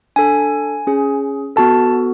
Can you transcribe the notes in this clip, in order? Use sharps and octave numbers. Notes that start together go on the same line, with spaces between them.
D4 A4 G#5
C#4 G#4
B3 F#4 A4 A5